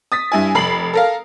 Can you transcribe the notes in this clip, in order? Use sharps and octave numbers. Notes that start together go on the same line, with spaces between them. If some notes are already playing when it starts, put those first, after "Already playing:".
D#6 A6 B6
G2 E4 G#5
F1 B5 C7 F#7
A4 A#4 F5